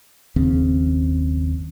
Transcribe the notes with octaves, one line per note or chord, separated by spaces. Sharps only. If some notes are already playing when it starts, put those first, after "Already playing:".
F#1 D#2 C#3 C4